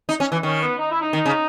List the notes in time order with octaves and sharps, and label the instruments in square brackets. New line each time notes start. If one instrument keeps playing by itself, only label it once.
[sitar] D#4
C#4
E3
[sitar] D#3 [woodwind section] C#4
[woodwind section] B3
D#4
E4
D#4
[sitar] D#3
C#3